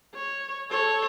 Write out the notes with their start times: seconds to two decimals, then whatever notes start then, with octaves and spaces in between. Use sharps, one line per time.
0.14 C#5
0.70 A4 C#5